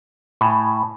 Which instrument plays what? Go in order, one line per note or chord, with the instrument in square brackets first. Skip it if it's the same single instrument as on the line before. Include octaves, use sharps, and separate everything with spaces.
[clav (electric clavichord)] A2 [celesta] G#5 B5